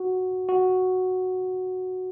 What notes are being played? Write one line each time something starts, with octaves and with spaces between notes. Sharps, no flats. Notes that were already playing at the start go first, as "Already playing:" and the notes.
Already playing: F#4
F#4